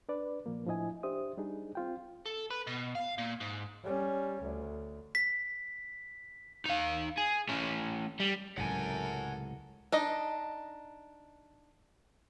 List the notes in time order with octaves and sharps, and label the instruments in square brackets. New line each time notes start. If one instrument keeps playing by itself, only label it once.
[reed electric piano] D4 B4 D5
A#2 F3 A#3
A2 F3 D4 E4 D#5 G#5
D4 G4 C5 E5 D#6
G3 D4 D#4 G#4
C4 F4 G5
[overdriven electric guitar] A4
B4
B2
F5
A#2
G#2
[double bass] G3 C#4
D2
[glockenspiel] B6
[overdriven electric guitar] D#4 F5
G#4
A3 C#4
G3
[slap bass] C#2 A2 C3 [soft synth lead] F#3 [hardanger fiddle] A4 A#4 [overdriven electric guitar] F#5 G#5
[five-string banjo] D4 D#4 D#5